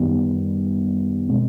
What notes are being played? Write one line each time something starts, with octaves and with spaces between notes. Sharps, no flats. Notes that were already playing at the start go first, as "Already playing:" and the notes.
Already playing: F#2 D#3 G3 B3
B2 G#3 C4